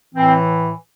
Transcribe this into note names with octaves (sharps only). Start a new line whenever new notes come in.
A2 E3 C4